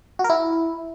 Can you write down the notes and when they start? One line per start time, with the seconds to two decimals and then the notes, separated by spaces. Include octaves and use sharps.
0.19 F#4
0.24 A#4
0.30 E4